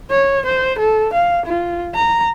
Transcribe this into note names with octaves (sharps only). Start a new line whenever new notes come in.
C#5
C5
A4
F5
F4
A#5